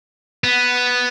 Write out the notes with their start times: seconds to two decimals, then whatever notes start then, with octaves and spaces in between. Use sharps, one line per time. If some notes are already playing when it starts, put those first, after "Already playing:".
0.44 B3